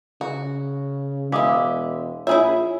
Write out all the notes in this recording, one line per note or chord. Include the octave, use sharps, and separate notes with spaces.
C#3 F#4
E1 G#3 E4 F5 D6 D#6
A#1 E4 F4 G#4 C#5 E5